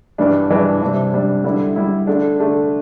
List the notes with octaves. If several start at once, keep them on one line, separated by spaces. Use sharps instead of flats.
G2 E3 G3 D4
G2 E3 G3 D4
C3 G3 D4
C3 G3 D4
D3 G3 E4
D3 G3 E4
D3 A3 D4
D3 A3 D4